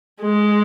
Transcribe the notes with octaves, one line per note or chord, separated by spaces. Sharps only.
G#3